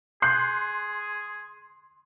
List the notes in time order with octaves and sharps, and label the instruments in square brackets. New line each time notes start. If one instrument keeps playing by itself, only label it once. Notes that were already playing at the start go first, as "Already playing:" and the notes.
[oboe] G#4 [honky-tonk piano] C6 F#6 C7 [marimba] G6